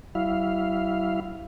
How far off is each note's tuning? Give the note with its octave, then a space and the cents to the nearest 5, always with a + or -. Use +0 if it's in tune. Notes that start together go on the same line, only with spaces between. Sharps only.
F#3 +45 E4 +0 F5 -5